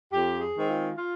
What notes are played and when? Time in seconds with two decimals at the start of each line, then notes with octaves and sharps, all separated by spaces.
0.12 F2 G4
0.40 G#4
0.55 D#3 G#3 C4
0.69 F4
0.97 F4